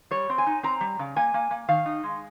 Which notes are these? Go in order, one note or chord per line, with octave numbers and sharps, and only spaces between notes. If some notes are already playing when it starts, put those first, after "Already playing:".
G3 C#5
C4
G#5
D#4
C4 A#5
G3
C#3
A#3 G#5
A#3
A#3
D#3 F5
D#4
G#3